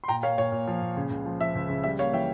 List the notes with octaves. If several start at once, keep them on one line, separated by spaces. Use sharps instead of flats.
C6
A#2 G5 A#5
A#3 C#5 F5
A#2 C#5
A#2
F3
A#2
C#3
C#2
F3
F3 E5
C#2
C#3
G3 E5
A#3 C#5 F5
E3 E5 G5